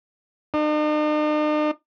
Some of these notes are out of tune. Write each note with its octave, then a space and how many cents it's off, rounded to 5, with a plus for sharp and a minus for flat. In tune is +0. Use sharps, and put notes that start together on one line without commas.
D#4 -45